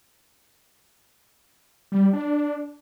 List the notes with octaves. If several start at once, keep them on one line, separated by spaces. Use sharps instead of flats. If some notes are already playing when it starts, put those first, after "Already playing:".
G3
D4